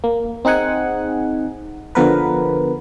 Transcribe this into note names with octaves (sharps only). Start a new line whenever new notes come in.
A#3
C4 D#4 G#4 F#5 G#5
D3 F3 B3 A#4 B4